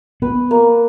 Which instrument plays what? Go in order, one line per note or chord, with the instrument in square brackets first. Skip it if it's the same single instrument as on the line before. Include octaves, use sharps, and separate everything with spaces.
[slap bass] B3 [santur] B4
[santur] A#3